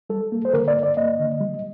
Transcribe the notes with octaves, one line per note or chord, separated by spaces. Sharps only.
G3 A4
A#3
C5
D3 A#4
D5
G2
D5
A#3 D#5
D3
G3